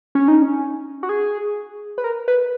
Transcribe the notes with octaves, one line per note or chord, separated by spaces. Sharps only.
C#4
D#4
C#4
F#4
G#4
B4
A#4
B4